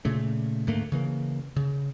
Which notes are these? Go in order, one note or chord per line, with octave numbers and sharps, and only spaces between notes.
A#2 C#3 A3
D2 G#2 A3 A#3
C#3 E3 A#3
C#3